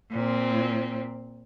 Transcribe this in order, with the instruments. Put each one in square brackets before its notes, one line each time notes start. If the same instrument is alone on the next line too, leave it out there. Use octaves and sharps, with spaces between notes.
[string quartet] A#2 C4